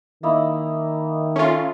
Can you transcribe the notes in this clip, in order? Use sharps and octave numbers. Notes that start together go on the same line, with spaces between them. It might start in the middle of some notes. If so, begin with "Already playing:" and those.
D#3 A#3 D#4 E4
A3 C#4 F4